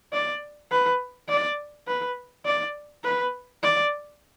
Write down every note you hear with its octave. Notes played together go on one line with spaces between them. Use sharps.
D5
B4
D5
B4
D5
B4
D5